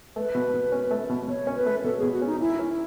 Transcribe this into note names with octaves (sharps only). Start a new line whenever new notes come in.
A3 B4
B2
B2
C#4
A3
B2
B2 C#5
C#4
B4
A3
B2 A4
B2 G#4
F#4
C#4
D#4
E3 E4
C#4
E4